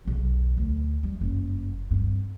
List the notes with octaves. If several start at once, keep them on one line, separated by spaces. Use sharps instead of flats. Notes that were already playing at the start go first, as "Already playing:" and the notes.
B1 E2
D2
G3
F#1 G2
G2 C4